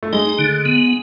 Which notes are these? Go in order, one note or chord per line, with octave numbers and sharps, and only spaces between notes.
A3
G#3 D#4
D3
B3